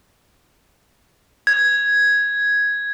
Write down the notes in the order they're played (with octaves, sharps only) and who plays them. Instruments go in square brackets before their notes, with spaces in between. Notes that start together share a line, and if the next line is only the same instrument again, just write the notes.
[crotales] G#6